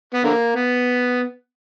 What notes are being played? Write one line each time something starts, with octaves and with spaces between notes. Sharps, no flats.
B3
D3 A#3
B3